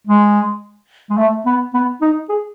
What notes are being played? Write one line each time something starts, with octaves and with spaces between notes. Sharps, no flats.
G#3
G#3
A3
B3
B3
D#4
G#4